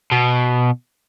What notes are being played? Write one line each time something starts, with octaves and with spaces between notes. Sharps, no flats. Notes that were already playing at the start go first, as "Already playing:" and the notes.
B2